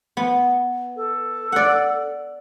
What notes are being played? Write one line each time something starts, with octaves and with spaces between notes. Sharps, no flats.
B3
A4
D5 F#5